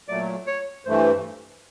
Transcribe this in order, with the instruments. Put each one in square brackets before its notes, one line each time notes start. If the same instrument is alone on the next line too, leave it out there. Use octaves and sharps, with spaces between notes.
[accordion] A#2 F#3 A3 [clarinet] D5
[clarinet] C#5
[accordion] G2 E3 A3 [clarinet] C5